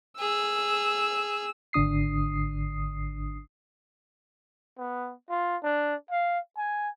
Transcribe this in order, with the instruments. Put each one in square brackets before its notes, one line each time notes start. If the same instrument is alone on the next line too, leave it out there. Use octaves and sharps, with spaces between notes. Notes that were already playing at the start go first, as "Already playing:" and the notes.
[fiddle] G#4 [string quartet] E6
[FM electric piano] G#1 D3 D4 D#6 C7
[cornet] B3
F4
D4
F5
G#5